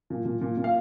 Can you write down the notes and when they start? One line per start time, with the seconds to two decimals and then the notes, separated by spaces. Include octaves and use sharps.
0.10 A#2
0.25 A#2
0.41 A#2
0.57 A#2
0.64 F5